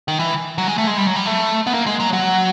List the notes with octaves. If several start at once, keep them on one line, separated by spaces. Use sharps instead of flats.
D#3
E3
F#3
G#3
A3
G#3
G3
F#3
G3
A3
B3
A#3
G#3
F#3
F#3